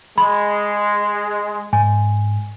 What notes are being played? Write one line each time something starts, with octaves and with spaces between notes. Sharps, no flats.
G#3 B5
G#2 G#5